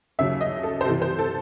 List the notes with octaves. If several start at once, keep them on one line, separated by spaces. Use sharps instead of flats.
D#2 C#3 F#3 E5
D#5
A4
C5
C2 C3 E3 A4
C5
A4